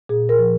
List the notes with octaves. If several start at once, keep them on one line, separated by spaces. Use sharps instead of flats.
A#2 G#4
A#4
F3